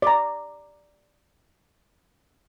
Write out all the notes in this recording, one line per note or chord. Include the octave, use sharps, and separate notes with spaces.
D5 A#5